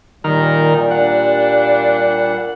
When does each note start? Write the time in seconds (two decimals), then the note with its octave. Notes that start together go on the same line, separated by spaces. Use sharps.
0.24 A#2 D#3 G3 A#4
0.91 D4 F#5